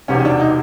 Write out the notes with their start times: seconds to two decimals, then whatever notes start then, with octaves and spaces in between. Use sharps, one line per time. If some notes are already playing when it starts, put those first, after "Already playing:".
0.08 E1 E2 C3 D#3 C#4
0.19 C#4
0.25 D4
0.40 D#4